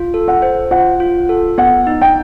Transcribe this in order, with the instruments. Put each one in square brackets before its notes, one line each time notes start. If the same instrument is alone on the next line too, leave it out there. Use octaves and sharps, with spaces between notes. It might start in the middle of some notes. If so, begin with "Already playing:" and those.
Already playing: [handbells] F4
A4
[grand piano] F#5
[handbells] C5
[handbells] F4 [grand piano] F#5
[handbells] F4
A4
[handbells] B3 [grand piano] F#5
[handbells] D#4
[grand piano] G5